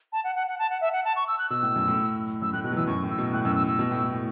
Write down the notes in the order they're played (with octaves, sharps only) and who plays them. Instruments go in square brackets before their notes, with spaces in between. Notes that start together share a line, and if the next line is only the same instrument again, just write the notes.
[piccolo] A5
F#5
F#5
F#5
A5
F#5
E5
F#5
A5
C#6
E6
F#6
[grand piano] B2 [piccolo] E6
[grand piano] A2
F#2
A2
[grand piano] F#2 [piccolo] E6
[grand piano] A2 [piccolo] F#6
[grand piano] B2 [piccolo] F#6
[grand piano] F#3
[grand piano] E3 [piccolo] E6
[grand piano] F#2 [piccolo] C#6
[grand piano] A2
[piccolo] E6
[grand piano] B2
[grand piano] A2 [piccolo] F#6
[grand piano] F#2 [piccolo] E6
[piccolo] E6
E6
[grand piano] B2
A2
A2
A2